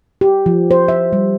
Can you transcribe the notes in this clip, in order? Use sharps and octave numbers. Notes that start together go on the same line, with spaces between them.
G4
F3
C5
E5
G3